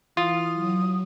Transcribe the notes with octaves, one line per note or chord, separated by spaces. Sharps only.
E3 F4 D#6 F6
F#3